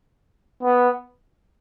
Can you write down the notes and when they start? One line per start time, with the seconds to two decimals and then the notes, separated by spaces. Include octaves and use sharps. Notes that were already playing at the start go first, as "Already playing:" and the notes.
0.63 B3